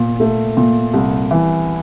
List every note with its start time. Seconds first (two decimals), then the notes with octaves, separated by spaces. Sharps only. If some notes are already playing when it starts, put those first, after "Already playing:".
Already playing: A#2
0.20 A3
0.57 A#2
0.93 C2
1.31 E3